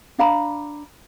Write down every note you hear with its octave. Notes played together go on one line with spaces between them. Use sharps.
D4 F5 A#5 B5